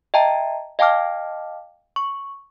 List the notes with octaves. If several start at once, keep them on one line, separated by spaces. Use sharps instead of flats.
D#5 E5 G5 A5 A#5
D#5 F5 G5 A5 D6 F6
C#6